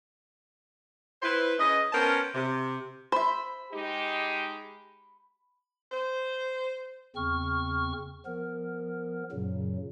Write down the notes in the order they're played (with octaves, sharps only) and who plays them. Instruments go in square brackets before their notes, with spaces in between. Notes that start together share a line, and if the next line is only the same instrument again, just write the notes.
[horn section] E4 B4 C5
C#3 C#4 B4 D#5
B3 C#4 A#4 C5 G5 A5
C3
[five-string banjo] C5 E5 [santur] B5
[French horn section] G#3 D#4 G4
[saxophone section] C5
[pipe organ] E2 C#3 C4 C#6 F6
F3 B3 A#4
F#2 A#2 C#3 F#3